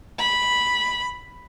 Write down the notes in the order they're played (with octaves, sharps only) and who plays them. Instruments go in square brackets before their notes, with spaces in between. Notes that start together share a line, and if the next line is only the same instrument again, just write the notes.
[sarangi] B5